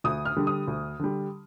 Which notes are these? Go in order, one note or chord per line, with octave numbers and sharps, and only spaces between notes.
D2 D#6
F6
D3 G3
D#6
D2
D3 G3